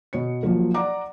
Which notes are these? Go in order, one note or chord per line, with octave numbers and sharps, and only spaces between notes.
B2 C#5 C#7
F3 F#3 A#3
D5 F#5 A#5 D6